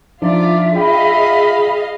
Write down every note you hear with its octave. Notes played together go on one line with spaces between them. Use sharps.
F3 D4 D#4 F4 D5 E5
F4 G#4 D#5 F5 G5 B5